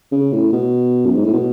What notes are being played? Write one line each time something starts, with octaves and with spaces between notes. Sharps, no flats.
C#3
A2
B2
F#2
G#2
A2
B2